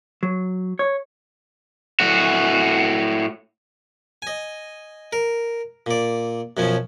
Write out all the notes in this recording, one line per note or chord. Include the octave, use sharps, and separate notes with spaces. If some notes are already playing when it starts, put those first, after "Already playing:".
F#3
C#5
A2 F#4
D#5 G#5
A#4
A#2 D5
F#2 B2 F3 C#4